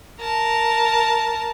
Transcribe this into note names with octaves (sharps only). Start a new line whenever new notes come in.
A#4 A5